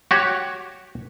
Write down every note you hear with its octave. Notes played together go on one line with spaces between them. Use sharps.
F#4 G4 C#5